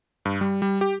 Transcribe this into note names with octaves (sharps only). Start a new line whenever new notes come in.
G2
G3
G3
G4